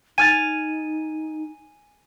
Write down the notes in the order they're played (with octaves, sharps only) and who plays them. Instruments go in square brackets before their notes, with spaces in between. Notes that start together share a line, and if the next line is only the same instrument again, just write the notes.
[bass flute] D#4 [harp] G#5 F6 A6 [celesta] D#7